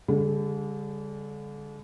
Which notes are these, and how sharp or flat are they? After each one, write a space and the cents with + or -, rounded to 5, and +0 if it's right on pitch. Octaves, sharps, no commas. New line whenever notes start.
D3 -35 G3 +40 A4 -35